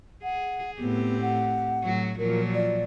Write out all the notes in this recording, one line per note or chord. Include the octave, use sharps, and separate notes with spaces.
G#4 F#5
A2 B3 C4 G4
F#5
A2 F#3 F#4
A#2 F3 F#3 A#4
D5